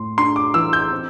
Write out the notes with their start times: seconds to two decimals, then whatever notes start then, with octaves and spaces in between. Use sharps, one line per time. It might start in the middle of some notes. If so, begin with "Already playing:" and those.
Already playing: A2 C6
0.17 D4 C6
0.36 D6
0.54 E3 E6
0.73 G6
0.92 C4